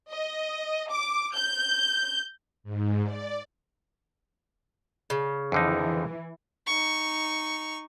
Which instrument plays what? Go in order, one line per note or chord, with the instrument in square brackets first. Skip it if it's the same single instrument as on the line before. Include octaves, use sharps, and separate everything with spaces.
[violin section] D#5
D6
G6
[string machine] G#2
D5
[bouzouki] C#3
[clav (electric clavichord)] F2 D3 D#4 [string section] E3
[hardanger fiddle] D#4 C#6